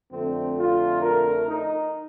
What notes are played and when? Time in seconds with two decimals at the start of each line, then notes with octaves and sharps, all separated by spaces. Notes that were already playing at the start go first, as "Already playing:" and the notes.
0.11 F2 D3 A3 C4
0.56 F4
1.02 A#4
1.47 D#4